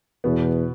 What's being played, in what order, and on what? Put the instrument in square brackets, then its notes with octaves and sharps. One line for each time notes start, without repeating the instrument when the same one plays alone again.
[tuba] E2 [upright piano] B2 B3